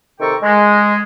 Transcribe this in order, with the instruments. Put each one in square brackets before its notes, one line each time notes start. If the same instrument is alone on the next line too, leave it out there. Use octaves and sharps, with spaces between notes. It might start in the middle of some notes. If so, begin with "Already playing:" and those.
[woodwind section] C3 D#3 A4 G5 A#5 C#6
G#3